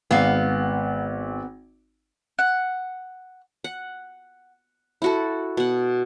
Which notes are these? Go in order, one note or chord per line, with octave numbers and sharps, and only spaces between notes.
G#1 B3 F5
F#5
F#5
E4 F#4 A4
B2 F#5